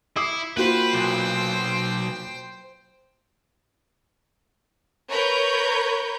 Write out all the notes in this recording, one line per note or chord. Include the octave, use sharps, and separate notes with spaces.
E4 D6 D#6 C7
A#3 F4 F#4 B4 C5 G5
B1
A#4 B4 C#5 A#5 B5 G6